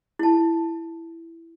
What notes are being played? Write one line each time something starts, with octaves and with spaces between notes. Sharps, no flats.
E4 A5